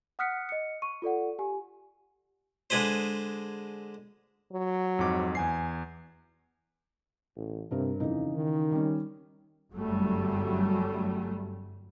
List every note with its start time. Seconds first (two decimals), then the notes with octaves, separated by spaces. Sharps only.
0.19 F#5 D#6 F6 F#6 B6 C#7
0.49 D#5 C#7
0.82 C#6 D#7
1.02 F4 A4 D5 F#5
1.39 G4 G#5
2.70 D3 G#3 G#4 B4 C5
4.53 F#3
4.99 F2 G#2 D6
5.35 E2 G#5 C7
7.36 A1
7.71 G2 C3 A#4
8.00 F2 C#3 E3 D#4
8.34 D#3
8.72 G3 C#4
9.75 G1 F#2 F#3 G3 A3